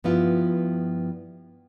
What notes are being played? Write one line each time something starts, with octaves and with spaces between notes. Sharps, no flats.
G2 F3 B3 E4 F4